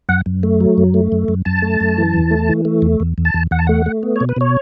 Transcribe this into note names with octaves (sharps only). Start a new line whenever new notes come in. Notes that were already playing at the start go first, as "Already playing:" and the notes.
F#2 F#5
F#2
A3
F#3
F#2
A3
F#2
F#2
F#2 A5
A3
F#2
E3
E2
A3
E3
A3
E2
E2
E2
A5
E2
E2 F#5
A5
A3 F#5
A3
B3
C#5
B2
B4
B2 C#5